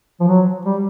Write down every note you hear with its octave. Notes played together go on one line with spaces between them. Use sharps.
F3
F#3
G3